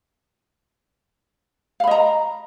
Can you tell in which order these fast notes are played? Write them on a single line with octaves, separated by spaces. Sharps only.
F5 B5 D#5 A#5